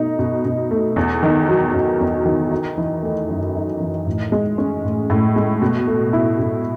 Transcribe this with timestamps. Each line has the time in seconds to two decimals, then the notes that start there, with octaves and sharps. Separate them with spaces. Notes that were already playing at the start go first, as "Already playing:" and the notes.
Already playing: B2 A3 D#4
0.19 B2
0.45 B2
0.71 A3
0.96 E2
1.23 D#3
1.49 F#3
1.74 E2
2.00 E2
2.26 D#3
2.51 D#4
2.78 E3
3.03 A3
3.28 F#2
3.55 D#4
3.80 E3
4.06 A2
4.32 G#3
4.58 C#4
4.84 A2
5.10 A2
5.36 G#3
5.62 B2
5.87 A3
6.13 E4
6.39 B2